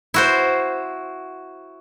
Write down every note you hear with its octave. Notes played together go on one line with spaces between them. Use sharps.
E4 F#4 C5